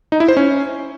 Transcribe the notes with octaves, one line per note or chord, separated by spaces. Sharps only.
D#4
E4
C5
C#4